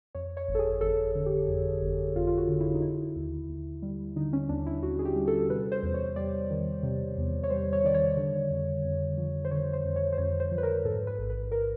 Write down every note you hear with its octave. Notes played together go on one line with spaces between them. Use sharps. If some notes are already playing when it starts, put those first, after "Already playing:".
F2 C#5
C#5
G1
A4
G#4
G1 A4
D3
G4
F2
G1
G1 F4
F4
F#4
D3
E4
D#4
D3 E4
D#2
D#2
G3
D3 D#4
C#4
D#2 D4
E4
D#2 F#4
G#4
G4
G3
A4
C3 B4
C5
E2
C#5
G3 D5
D#3
C3
E2
C#5
G3 C5
C#5
D#3 D5
C#5
D3
F2
F2
F3
C5
D3 C#5
C5
F2
C#5
C5
F2 C#5
C5
F3
B4
A#4
G#2 A4
B4
A1
B4
A#4